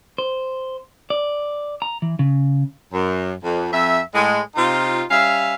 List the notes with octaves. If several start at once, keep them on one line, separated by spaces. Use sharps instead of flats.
C5
D5
A#5
E3
C#3
F#2
F2
F2 E5
A2 G#3
C3 D#4 F4
G3 C#4 E5 F5